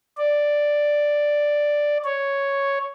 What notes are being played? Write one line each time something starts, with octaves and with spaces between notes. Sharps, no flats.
D5
C#5